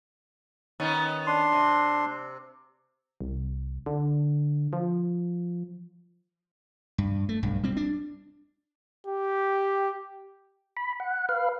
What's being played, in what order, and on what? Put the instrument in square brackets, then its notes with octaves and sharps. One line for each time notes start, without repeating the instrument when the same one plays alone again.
[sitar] D#3 B3 C#4
[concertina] D4 C6
[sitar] C3
[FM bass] C2
D3
F3
[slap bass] G2
A3
B1 G2
G3 C4
D4
[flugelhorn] G4
[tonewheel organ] B5
F#5
B4 F5